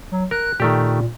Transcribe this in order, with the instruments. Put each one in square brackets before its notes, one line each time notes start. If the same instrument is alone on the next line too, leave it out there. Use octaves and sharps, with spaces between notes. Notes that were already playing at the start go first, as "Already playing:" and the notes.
[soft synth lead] F#3
[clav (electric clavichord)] A#4 [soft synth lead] F#6
[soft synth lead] A#2 [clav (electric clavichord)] D#3 A3 G4